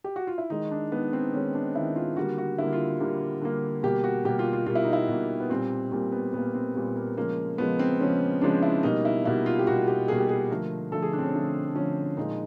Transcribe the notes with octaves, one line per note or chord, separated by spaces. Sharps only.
G4
F#4
F4
E4
D#3 G#3 D#4
D4
D#3 G#3 B3
C4
D#3 G#3 C#4
D4
D#3 G#3 E4
F4
D3 G3 A#3 F#4
F#4
D3 G3 A#3 E4
F4
D3 G3 A#3
D3 G3 A#3
B2 G3 A#3 G4
F#4
B2 G3 A#3 G4
F4
F4
B2 G3 A#3 F4
E4
D#4
E4
B2 G3 A#3
B3
A#2 G3 A#3 C4
A#2 G3 A#3 C4
B3
A#2 G3 A#3 B3
C4
A#2 G3 A#3
A#3
C#3 F3 G#3 A#3
C#3 F3 G#3 B3
C4
C#3 F3 G#3 C#4
C#3 F3 G#3 D4
E4
B2 G3 A#3 D#4
E4
B2 G3 A#3 E4
F4
G4
B2 G3 A#3 F#4
G4
B2 G3 A#3 G#4
G4
G#4
D3 F3 A3 A#4
D3 F3 A3 A4
G#4
D4
C4
C#4
D3 F3 A3
D3 F3 A3 C#4
A#2 F3 G#3 D#4